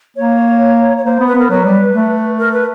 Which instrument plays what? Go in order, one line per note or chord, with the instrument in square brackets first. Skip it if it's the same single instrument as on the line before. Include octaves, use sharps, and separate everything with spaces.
[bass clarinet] A#3 [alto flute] C#5
[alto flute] C#5
[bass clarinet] A#3 [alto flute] C5
[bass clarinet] B3
[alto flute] B4
[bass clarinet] B3 [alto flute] A#4
[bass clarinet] F#3 [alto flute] B4
[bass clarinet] G3
A3
[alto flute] A#4
B4